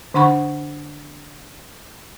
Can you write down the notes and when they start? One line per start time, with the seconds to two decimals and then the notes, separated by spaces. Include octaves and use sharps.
0.14 D3 D4 F#5 B5 C#6